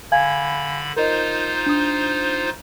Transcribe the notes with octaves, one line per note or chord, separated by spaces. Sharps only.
D3 F5 G#5 B5 G#6
D#4 F4 A#4 C5 D#5
D4 D#6